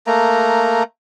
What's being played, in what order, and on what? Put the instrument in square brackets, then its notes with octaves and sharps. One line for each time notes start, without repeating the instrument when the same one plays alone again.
[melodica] A3 A#3 A#5